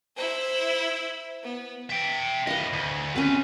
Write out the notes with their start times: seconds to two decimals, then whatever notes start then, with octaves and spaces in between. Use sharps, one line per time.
0.17 E4 C5
1.43 B3
1.89 E5 G5
2.47 A2 B4 D#5 F5
2.73 D2
3.16 F#3 C4 C#4 B4